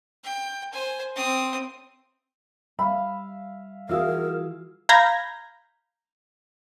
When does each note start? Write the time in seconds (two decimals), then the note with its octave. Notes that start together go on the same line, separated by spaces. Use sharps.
0.24 G5
0.73 C5 G#5
1.16 C4 D#6
2.79 G3 E5 F5 B5
3.89 E3 F4 F#4 G#4 A#4 E5 F5
4.89 F5 A#5 B5 G6 G#6 A#6